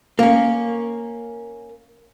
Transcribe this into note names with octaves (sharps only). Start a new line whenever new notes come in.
A#3 C#4